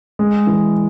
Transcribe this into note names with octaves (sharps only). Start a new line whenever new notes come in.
G#3
E3